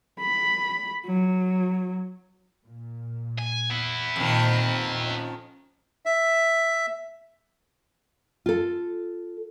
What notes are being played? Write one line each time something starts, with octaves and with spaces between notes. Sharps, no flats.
B5
F#3
A#2
G#5
B3 E4
F2 A#2 D#3 C4
C#4
E5
F4 A4